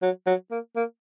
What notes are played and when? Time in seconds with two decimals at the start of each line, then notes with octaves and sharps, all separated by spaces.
0.02 F#3
0.27 F#3
0.51 A#3
0.76 A#3